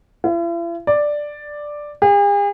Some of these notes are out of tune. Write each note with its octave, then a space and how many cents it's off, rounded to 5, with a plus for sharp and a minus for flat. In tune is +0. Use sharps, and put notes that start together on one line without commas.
E4 +45
D5 +5
G#4 -45